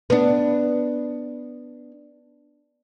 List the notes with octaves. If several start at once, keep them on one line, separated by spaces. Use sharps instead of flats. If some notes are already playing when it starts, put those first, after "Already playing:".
B3 D4